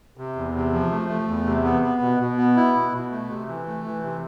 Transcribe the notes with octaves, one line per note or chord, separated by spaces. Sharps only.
C3
E2
C3
F3
A3
A3
E2
C3
B3
B3
B2
B2
B3
E4
B2
B2
A3
C3
E3
A3
E3
C3